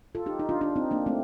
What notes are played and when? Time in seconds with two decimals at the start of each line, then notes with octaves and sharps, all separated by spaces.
0.15 F4 A4
0.26 D#4 G4
0.40 D#4
0.49 D4 F4
0.61 D4 F4
0.76 C4 D#4
0.91 A#3 D4
1.06 A3 C4